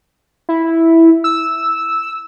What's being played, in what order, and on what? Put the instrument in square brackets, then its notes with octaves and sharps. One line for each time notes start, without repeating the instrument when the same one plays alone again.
[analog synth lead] E4
E6